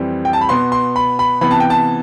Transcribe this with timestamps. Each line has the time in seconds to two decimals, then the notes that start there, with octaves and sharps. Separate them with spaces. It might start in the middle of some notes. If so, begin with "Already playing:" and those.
Already playing: F2 E3 G3 C4
0.25 G5
0.33 A5
0.41 B5
0.49 B2 B3 C6
0.72 C6
0.96 B5
1.19 B5
1.41 C3 E3 B3 B5
1.51 A5
1.60 G5
1.70 A5